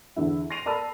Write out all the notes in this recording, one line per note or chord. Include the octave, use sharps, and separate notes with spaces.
E2 D3 E4
C6 A#6 C7 D7 D#7 F7
A4 A#4 D5 A5 B5 E6